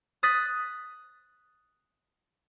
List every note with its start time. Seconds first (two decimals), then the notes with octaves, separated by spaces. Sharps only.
0.23 D#6 F#6 A6 B6